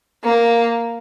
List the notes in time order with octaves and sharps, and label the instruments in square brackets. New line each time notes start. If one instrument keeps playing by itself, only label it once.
[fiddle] A#3